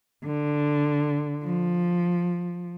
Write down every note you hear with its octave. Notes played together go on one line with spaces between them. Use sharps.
D3
F3